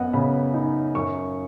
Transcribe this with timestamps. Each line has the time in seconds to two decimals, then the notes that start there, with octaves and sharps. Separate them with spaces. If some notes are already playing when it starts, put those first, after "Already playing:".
Already playing: F#2 B3 D#5 F#5
0.13 C#3 B5
0.54 D#4
0.95 F#2 C#6